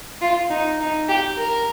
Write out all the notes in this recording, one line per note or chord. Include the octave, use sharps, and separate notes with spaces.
F4
D#4
D#4
G4
A#4